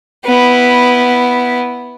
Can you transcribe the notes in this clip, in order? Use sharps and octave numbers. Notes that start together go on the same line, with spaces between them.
B3 E4